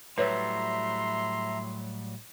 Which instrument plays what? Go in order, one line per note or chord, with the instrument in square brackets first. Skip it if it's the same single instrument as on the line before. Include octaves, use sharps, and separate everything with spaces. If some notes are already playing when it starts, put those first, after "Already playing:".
[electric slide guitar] A2 F#3 G3 [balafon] B4 C#5 [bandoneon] E5 A#5 [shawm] C6